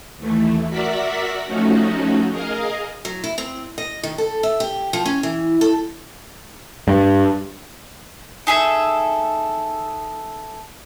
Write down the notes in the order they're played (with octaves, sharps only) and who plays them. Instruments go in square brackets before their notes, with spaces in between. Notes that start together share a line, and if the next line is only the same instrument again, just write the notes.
[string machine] D#2 E3 A3
F#4 A#4 D5 E5 F#5 B6
F3 A3 C#4 D#4 F#4
G#4 A#4 D#5 F5
[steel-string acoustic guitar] F#3
E4
C4
D#5
D#3
A4
E5
G4
F3
C#4
E3
A4
[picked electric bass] G2
[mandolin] D#4 G#4 A4 E5